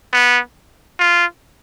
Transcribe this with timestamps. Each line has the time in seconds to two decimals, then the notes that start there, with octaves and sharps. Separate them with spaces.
0.13 B3
1.00 F4